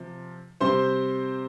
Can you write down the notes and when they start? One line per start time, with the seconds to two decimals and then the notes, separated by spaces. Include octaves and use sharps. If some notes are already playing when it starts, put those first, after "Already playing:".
Already playing: C3 F3
0.60 C3 G3 C4 C5 C6